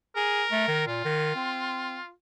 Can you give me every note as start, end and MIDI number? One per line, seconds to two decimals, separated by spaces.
0.16 0.43 68
0.16 0.85 70
0.52 0.66 57
0.68 0.83 51
0.87 1.02 46
0.87 2.11 65
1.05 1.35 51
1.36 1.98 60